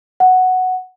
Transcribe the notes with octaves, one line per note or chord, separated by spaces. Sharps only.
F#5